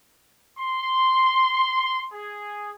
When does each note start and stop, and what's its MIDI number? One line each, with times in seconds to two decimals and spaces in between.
0.59 2.05 84
2.13 2.73 68